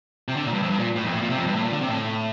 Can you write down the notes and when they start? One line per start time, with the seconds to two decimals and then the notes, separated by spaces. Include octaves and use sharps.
0.28 C3
0.36 D3
0.46 A#2
0.53 G2
0.62 F2
0.70 G2
0.79 A#2
0.96 A2
1.04 F2
1.13 A2
1.21 A#2
1.30 C3
1.38 F2
1.47 G2
1.56 A2
1.64 A#2
1.72 D3
1.81 C3
1.88 A2